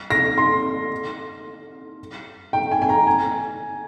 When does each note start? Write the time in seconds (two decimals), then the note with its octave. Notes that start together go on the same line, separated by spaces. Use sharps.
0.10 A#6
0.38 C6
2.53 G5
2.71 G#5
2.82 G#5
2.89 A#5
3.07 G#5